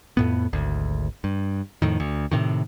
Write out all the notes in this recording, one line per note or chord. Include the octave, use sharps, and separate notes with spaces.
F2 A2 B3
G#1 D2
G2
F2 A2 D#3
D2
A2 C3 D#3